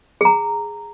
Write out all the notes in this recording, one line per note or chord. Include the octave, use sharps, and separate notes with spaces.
G#4 A#5